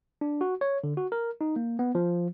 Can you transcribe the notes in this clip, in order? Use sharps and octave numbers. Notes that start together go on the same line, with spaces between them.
D4
F#4
C#5
D3
F#4
A#4
D#4
A#3
B3
F3